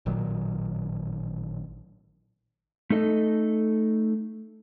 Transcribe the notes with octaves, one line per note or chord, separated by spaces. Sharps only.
A1 A#2 D#3 F#3
A3 D#4 A4 D#5